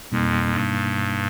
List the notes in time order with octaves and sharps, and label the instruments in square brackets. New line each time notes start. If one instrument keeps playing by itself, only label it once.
[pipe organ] F2 [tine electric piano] B2 G3 A#3 D#4
[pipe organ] G2